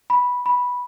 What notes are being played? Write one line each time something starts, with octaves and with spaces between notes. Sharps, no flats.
B5
B5